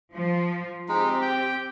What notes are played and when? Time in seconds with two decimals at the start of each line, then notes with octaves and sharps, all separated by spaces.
0.14 F3
0.89 G#3 C4 D#4 G4
1.22 G5